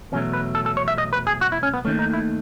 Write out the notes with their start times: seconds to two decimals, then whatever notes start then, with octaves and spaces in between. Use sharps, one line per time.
0.12 E2 B2 F#3 A3 C#4
0.33 B4
0.55 A4
0.66 A4
0.77 C#5
0.88 E5
0.98 D#5
1.13 B4
1.27 G#4
1.41 F#4
1.52 E4
1.63 C#4
1.74 B3
1.85 D#2 D#3 A3 C#4
1.99 D#4
2.14 E4